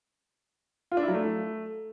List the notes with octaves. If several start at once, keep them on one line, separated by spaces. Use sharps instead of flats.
F4
D4
E4
F#3
A3